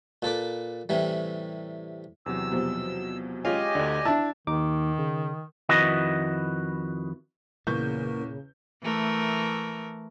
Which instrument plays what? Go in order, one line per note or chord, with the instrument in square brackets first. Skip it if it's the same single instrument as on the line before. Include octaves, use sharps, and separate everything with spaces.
[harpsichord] A#2 A4 B4 D6
A2 C3 E3 G3
[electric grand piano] E2 C3 F#3 [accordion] E6
[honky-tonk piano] B2 F3 G3
[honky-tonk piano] G#3 C#4 [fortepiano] F4 [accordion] G4 D#5 G#5
[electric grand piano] D2 D3 [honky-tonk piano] D5
[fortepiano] D4 A5 [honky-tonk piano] E4 [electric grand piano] E6
[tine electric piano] D#2 D#4 D6 [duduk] D#3
[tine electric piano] C#3
[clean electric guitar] F2 D#3 E4 F#4 B4 D#5
[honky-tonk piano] E2 C#6 G6 [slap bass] A#2 [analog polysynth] C#3 [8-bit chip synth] A#3 A#4
[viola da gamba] E3 A3 A#4